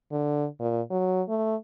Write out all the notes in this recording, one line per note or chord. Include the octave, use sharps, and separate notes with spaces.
D3
A#2
F#3
A3